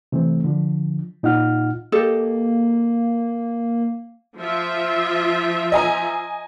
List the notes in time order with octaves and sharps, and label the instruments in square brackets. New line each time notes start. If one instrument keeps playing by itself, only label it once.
[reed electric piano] C3 E3 A3 C4
D3 F3
A#2 D#4 F4 F#5 F6
[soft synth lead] A#3 [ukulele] G4 A4 D#5
[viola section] F3 F4 E5
[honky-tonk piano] D#5 G#5 A#5